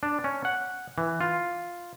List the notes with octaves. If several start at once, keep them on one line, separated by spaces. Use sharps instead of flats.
D4
C#4
F#5
E3
F4